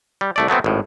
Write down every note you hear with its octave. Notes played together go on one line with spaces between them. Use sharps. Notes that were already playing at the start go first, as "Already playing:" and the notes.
G3
C2 A3 D5
F#3 A3 B3 C4
G#1 A2